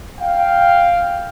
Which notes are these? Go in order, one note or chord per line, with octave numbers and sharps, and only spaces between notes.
F5 G5